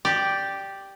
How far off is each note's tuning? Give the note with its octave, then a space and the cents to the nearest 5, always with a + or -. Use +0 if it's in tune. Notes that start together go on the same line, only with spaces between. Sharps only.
G4 +0 D5 +0